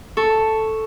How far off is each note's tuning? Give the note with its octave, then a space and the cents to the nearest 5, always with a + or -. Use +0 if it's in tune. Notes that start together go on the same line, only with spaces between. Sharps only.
A4 +0 C#6 +0